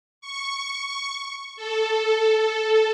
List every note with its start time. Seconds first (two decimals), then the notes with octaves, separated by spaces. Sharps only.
0.21 C#6
1.56 A4